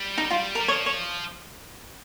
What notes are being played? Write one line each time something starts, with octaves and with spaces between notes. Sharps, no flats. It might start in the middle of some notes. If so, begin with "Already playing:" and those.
Already playing: G3
D#4
F4
A#4
G3
F3 C#5
C#5